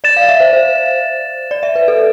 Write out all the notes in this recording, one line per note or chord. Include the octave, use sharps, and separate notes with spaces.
D5 A6 E7
F5
E5
C5
C5
D5
E5
B4
A4